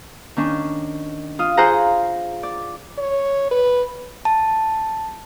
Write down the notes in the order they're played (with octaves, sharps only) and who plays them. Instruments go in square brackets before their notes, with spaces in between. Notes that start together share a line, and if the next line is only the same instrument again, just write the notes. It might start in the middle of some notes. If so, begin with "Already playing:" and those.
[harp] D#3 C#4 D4
F4 D#6 F6
F4 G#4 C5 F#5 A#5
D5
[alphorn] C#5
B4
[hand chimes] A5